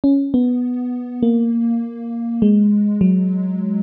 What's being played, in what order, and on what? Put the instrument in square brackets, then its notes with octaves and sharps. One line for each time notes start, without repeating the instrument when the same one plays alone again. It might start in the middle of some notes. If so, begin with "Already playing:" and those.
[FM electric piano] C#4
B3
A#3
G#3
F#3